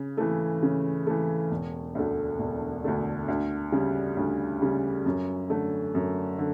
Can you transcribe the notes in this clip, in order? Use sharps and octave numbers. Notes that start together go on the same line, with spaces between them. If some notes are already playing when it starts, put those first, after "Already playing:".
Already playing: C#3
E3 A3
C#3
E3 A3
E1
D2 D3 A3
E1
D2 D3 A3
D2
C#3 G3
D2
C#3 G3
F#2
D3 A3
F#2
D3